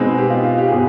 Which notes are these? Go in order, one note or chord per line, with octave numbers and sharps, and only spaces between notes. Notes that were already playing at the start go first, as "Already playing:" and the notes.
Already playing: B2 G#3 C4 D#4
G4
F4
F4
G4
B2 G#4